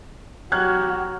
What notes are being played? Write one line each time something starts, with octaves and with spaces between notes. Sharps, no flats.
F#3 F#4 G4 F6 F#6 G#6